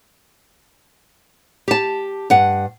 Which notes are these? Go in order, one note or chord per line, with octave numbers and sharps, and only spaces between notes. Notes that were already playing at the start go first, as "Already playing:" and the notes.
G4 A5
G2 F#5